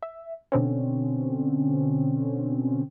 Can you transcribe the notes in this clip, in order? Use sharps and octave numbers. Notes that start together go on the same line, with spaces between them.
E5
B2 D3 C4 C#4